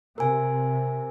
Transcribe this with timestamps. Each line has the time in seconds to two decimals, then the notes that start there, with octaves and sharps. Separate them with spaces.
0.18 C3 A#4 G#5